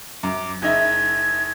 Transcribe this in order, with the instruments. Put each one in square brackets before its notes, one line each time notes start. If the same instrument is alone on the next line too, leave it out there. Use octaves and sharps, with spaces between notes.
[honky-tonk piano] F#2 [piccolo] D6
[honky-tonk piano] F#1 D#4 E5 [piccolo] G#6